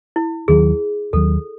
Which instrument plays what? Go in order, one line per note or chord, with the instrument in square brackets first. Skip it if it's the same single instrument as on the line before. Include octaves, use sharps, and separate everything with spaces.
[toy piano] E4
[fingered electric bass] D#2 D#3 F#3 [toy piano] G#4
[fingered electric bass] D#2 D#3 F#3 [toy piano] A4